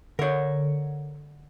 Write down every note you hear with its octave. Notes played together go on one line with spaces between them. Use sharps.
D3 A#4 C#5